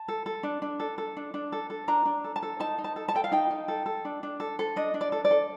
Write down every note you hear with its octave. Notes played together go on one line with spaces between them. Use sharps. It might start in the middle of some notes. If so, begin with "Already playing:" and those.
Already playing: A5
A4
A4
D4
D4
A4
A4
D4
D4
A4
A4
D4 A#5
D4
A4
A5
A4
D#4 A5
D#4
A5
A4
A5
A4 G5
F5
D#4 G5
D#4
A4
A4
D4
D4
A4
A4
D4 D#5
D4
D5
A4
D5
A4